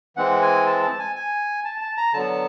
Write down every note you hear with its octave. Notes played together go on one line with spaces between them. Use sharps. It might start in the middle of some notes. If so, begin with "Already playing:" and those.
E3 G#3 C4 F#5
G#5
A5
A5
G#5
G#5
A5
A5
A#5
D3 F#3 B3 A5